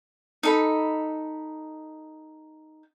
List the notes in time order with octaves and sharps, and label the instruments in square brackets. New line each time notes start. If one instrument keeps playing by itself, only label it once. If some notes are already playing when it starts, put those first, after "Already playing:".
[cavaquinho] D#4 A4 B5